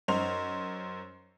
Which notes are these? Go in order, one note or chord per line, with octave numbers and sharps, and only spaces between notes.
F#2 D#4 C5 F7